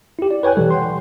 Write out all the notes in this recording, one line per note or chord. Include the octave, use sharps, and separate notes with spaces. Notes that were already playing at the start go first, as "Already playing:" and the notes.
E4 G4
D5
B4 C#5 G5 G#5 F#6
B2 E3 G3 A4
F#5 G5 C6